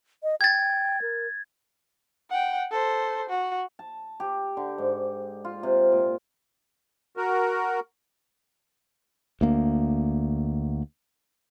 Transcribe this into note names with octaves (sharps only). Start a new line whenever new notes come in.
D#5
G5 G#6 A6
A#4
F#5 G5
A4 C5
F#4
A5
G4
D3
G#2
F4
C3
A#2
F#4 A#4
D2 A#3